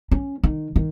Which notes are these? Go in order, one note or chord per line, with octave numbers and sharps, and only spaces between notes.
C#4
D#3
D#3